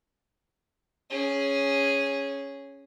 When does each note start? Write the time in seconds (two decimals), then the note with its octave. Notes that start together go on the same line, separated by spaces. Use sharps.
1.10 C#4 G#4